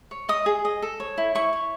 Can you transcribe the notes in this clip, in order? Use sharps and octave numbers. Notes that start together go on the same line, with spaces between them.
C#5
D#5 D#6
G#4
D#5
A4
C#5
E4
E4 C#6
C#5